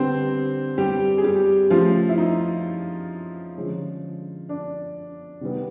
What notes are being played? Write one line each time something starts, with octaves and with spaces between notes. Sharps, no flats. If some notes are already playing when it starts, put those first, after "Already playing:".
Already playing: D3 G3 B3 C4 C5
G3 G4
G#4
G3 G4
C#3 F3 A3 F4
E4
D#4
D3 F3 G#3 C#4
D4
C3 D#3 G3 B3